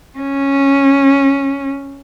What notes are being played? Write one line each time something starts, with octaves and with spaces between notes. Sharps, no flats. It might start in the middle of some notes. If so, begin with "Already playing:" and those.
C#4